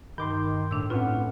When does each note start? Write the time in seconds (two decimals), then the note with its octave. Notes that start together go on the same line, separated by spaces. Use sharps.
0.18 G2 D#3 C6 D6 G6
0.71 A2 D4 E6
0.90 A2 C4 C#4 F4 B4 F#5